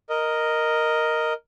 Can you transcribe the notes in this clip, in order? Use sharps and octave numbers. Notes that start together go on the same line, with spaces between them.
A#4 D#5